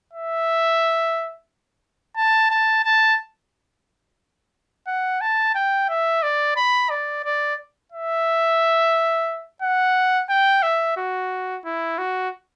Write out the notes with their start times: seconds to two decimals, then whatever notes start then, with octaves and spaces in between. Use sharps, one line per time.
0.13 E5
2.16 A5
2.51 A5
2.84 A5
4.87 F#5
5.21 A5
5.55 G5
5.89 E5
6.23 D5
6.57 B5
6.90 D5
7.24 D5
7.92 E5
9.62 F#5
10.29 G5
10.63 E5
10.97 F#4
11.65 E4
11.98 F#4